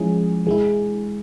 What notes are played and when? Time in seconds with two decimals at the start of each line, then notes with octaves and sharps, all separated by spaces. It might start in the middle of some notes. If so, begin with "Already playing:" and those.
Already playing: F3 G#3 C#4 E4 G#4
0.46 E3 G#3 E4 G#4